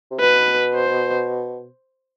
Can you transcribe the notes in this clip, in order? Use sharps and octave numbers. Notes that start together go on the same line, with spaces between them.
C3
B2 B4
C5